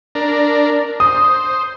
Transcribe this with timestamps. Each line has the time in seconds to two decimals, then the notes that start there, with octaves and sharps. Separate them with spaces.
0.15 D4 A#4
1.00 C5 D#6